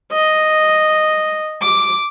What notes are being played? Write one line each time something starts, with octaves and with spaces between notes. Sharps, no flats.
D#5
D6